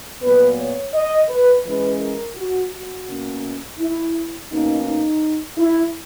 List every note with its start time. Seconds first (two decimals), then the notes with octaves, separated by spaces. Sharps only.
0.23 A#2 F#3 B3 B4
0.58 C#5
0.94 D#5
1.29 B4
1.65 E3 G#3 C#4 B4
2.01 A#4
2.36 F#4
2.72 F#4
3.08 B2 A#3 C#4
3.79 E4
4.51 B2 A#3 C#4 D#4
4.86 D#4
5.58 E4